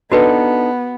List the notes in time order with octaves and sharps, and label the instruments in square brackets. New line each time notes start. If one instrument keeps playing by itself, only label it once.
[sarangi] B3 [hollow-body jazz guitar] D4 D#4 A4 [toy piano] F#4 B4